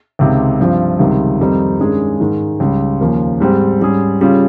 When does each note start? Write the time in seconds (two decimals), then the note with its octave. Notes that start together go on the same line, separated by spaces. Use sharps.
0.19 C#2 C3 D#3
0.59 G2 F3 C4 F4
0.99 C#2 C3 D#3 G3
1.40 F2 D#3 G3 C4 D#4
1.80 G2 D#3 G#3 C#4 G#4
2.20 G#2 D#3 G#3
2.60 C#2 C#3 G3
3.01 D#2 C#3 F3 A#3 C#4
3.40 G#2 G3 C4 G4
3.81 G#2 G3 C#4 G#4
4.21 C#3 G3 C#4 F4 G#4